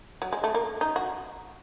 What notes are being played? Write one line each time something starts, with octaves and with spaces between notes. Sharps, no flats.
F#3
G#3
A3
A#3
D#4
F#4